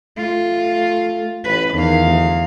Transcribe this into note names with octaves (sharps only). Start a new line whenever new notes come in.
A3 F4
A1 B4
E2 D#3 F5
D2